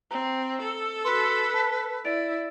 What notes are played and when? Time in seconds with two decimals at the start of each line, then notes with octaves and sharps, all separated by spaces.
0.11 C4 A#5
0.62 A4
1.05 F#4 B4 C6
1.54 A5 B6
2.05 E4 D5 A6 D7